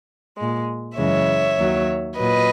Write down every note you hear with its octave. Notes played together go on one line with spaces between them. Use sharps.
A#2 G#3
F#2 C#3 E3 G#3 C#5 E5
D#2 D#3 F#3
A#2 F#3 B4 D#5